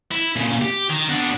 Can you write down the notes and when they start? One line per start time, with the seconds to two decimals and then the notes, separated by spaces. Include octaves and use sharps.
0.12 E4
0.36 A#2 C#3
0.61 G4
0.89 D#3
1.09 B2 D4